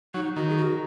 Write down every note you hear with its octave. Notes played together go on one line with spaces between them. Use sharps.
F#3 D#4
D#3 F#4
G#4
F#4